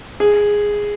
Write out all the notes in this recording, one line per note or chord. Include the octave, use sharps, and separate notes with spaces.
G#4